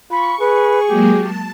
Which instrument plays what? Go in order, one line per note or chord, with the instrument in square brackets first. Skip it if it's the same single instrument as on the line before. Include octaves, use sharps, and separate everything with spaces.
[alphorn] F4 [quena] B5 [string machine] C#6
[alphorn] G#4 [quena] B4
[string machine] F#3 G#3 A#3 [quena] G4
[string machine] A5